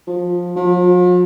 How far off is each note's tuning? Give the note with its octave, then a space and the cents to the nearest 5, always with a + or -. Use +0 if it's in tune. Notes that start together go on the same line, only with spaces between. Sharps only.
F3 +15
F3 +45